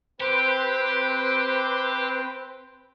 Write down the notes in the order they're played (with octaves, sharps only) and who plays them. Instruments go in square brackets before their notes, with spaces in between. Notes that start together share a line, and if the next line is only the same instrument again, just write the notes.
[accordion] C4 B4 C5 [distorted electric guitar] G4